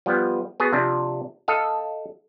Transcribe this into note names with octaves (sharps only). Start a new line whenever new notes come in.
F3 G3 B3
B3 F#4 G#4
C3 F3 D4
A4 D#5 F5